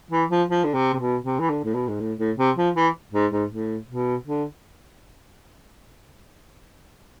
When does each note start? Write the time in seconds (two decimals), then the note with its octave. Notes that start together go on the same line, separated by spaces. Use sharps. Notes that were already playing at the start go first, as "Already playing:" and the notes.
0.11 E3
0.30 F3
0.49 F3
0.64 D3
0.74 C3
0.94 C3
0.99 B2
1.24 C3
1.40 E3
1.50 D3
1.64 A2
1.74 B2
1.88 G#2
2.00 A2
2.18 A2
2.37 C3
2.57 F3
2.75 E3
3.13 G#2
3.32 G#2
3.50 A2
3.89 B2
4.26 D3